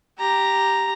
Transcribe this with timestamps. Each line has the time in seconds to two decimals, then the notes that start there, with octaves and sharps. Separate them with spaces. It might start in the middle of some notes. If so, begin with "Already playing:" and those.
0.18 G4 A#5